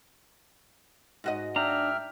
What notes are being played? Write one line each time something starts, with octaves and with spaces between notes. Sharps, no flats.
G#2 F#4 D#5
D4 E5 G5 A#5 F6